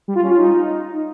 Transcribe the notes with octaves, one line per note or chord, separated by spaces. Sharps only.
G3
F4
C#4
F4
D#4